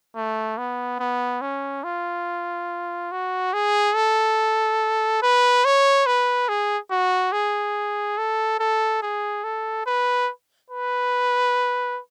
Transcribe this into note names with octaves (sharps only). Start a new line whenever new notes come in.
A3
B3
B3
C#4
F4
F#4
G#4
A4
B4
C#5
B4
G#4
F#4
G#4
A4
A4
G#4
A4
B4
B4